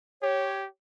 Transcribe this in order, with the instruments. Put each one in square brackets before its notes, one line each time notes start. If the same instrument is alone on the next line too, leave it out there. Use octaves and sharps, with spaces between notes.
[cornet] G4 [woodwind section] C#5